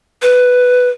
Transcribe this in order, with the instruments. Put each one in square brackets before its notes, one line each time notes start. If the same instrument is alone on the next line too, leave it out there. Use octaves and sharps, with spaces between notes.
[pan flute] B4